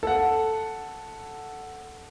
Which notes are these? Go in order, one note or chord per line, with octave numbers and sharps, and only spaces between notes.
A4 F#5